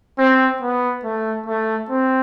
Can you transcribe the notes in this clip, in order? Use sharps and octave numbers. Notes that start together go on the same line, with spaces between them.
C4
B3
A3
A3
C4